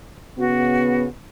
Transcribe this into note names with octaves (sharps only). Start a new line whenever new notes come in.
C#3 B3 F#4